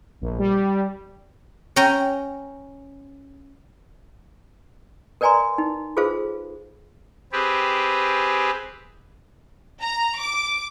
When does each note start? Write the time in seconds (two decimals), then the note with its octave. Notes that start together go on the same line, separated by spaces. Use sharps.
0.22 A#1
0.39 G3
1.76 C#4 G5 A#5
5.21 A#4 B4 D5 G#5 A#5 C6
5.58 D#4
5.97 F4 G#4 A4 B4 C5 F5
7.32 C4 G4 G#4 B4
9.82 A#5
10.20 D6